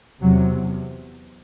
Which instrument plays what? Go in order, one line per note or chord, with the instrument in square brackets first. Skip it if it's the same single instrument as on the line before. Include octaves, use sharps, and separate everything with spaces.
[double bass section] E2 C3 F#3